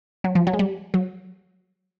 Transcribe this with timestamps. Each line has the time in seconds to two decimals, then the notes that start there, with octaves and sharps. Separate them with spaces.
0.24 F#3
0.35 F3
0.47 F#3
0.53 G#3
0.59 G3
0.94 F#3